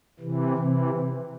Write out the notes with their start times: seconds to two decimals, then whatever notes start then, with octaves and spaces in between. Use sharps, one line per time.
0.20 C3 E3
0.57 C3 E3